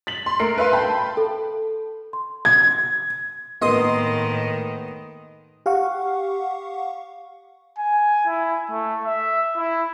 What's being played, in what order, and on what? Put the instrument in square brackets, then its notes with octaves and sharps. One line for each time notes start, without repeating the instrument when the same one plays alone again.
[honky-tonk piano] A6 B6 F#7
C6
A3 A#4 C7 D7
B4 E5 F5 C6
G5 A5 B5
[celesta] A4
C6
[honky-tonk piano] G#6
[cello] A2 D#3 [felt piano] A#3 B3 [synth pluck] D#5 C6 D#6
[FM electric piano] G4 F5 F#5 C#6
[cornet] G#5
E4
A3
E5
E4